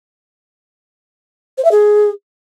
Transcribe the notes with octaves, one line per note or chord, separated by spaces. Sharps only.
C5
E5
G#4